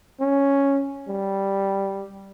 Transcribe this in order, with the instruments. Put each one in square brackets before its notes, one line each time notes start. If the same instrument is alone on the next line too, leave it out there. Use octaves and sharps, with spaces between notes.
[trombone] C#4
G3